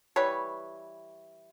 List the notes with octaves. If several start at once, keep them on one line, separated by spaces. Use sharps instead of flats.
E3 G3 B4 C#5